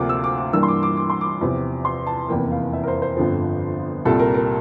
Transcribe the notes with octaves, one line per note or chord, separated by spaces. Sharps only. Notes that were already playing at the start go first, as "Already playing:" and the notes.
Already playing: D2 C3 F3 A#3 F4 D6
E6
D6
D6
G2 E3 A#3 D4 E6
C6
D6
D6
D6
C6
D6
E2 C3 F3
C6
A5
F1 E2 E3 A#3 G5
F5
E5
A#4
C5
C5
G1 F2 D3 F3
C2 A#2 G3 A4
A#4
A#4